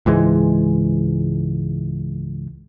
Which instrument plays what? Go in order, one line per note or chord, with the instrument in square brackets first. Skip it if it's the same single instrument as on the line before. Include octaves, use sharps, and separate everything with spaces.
[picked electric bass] C#2 G#2 E3 G#3